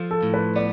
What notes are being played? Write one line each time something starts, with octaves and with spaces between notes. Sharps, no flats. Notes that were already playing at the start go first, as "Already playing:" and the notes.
Already playing: F3 F4 A4
A4
A2
B4
B3 D5